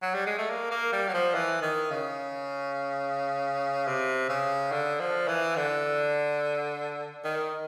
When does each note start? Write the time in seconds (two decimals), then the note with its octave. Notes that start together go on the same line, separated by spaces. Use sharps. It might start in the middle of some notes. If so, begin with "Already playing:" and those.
0.02 F#3
0.14 G3
0.26 G#3
0.38 A3
0.50 A#3
0.71 A#3
0.92 G3
1.08 F#3
1.14 F3
1.35 E3
1.62 D#3
1.91 C#3
3.87 C3
4.29 C#3
4.72 D3
5.00 F3
5.28 E3
5.56 D3
7.25 D#3